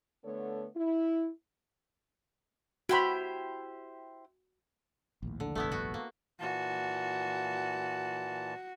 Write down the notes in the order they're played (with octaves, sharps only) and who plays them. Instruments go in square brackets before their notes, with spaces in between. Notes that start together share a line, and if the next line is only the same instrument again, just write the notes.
[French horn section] D3 A3 B3 A4 C#5
E4
[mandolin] E4 G4 C5 [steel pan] F#4 B5
[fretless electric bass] A#1 D#2 A2
[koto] D3
[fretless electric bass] F1 A#1 G2 [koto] A3 B3 E4
[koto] B3 F#4
A#3
[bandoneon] A#2 E3 A5 [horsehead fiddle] F#4